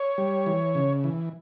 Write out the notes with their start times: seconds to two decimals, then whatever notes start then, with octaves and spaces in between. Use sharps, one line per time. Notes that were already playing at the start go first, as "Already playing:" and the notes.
Already playing: C#5
0.18 G3
0.46 E3
0.75 C#3
1.04 E3